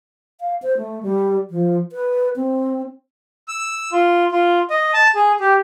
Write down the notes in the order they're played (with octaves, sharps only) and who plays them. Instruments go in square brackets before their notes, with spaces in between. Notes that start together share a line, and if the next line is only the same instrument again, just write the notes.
[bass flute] F5
C5
A3
G3
F3
B4
C4
[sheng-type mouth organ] E6
F4
F4
D#5
A5
G#4
G4